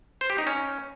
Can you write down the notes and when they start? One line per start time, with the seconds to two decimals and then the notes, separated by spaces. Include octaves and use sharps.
0.21 C5
0.30 G4
0.38 D#4
0.47 C#4